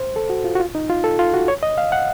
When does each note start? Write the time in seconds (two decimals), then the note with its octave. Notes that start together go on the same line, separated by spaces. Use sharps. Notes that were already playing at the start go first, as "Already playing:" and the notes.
Already playing: C5
0.16 A4
0.30 F#4
0.44 F4
0.55 F#4
0.60 F4
0.75 D#4
0.90 F4
1.04 A4
1.19 F4
1.34 F#4
1.48 C#5
1.63 D#5
1.78 F5
1.92 F#5